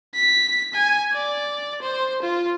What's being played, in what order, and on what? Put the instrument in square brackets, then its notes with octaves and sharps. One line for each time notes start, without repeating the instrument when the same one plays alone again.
[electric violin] B6
G#5
D5
C5
F4